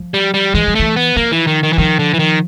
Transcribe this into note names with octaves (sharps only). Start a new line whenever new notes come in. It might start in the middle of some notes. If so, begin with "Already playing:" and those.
Already playing: F3
G3
G3
E3 G#3
F3
E3 A3
B3
F3 A#3
E3
D#3
D#3
E3
D#3 F3
D3
E3
D#3